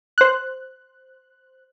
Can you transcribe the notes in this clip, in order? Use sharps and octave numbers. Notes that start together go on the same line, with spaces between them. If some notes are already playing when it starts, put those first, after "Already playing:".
C5 F#6